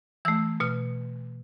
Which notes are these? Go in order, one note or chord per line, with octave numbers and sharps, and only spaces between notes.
E3 A3 E6
B2 F6